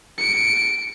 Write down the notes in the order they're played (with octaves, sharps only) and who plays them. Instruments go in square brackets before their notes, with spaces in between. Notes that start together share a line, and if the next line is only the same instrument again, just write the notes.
[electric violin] C#7 D7